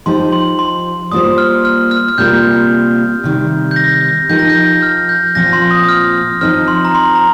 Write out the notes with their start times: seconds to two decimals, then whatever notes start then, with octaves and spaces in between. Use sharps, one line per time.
0.06 F3 D#4 G4 C5 C6
0.32 C6
0.59 C6
1.12 G3 A#3 F4 C5 D#6
1.38 F6
1.65 F6
1.91 F6
2.09 F6
2.18 C3 G3 A#3 F4 A#4 G6
3.24 C3 D#3 G3
3.71 G6
3.76 A#6
4.29 F3 D#4 G4 A#4 G6
4.39 A#6
4.50 G6
4.82 F6
5.09 G6
5.35 A#2 F3 C4 F4 A#6
5.53 C6
5.71 D#6
5.83 D#6
5.89 F6
6.41 F3 C4 D#4 C5 F6
6.68 C6
6.85 A#5
6.95 C6
7.15 A#5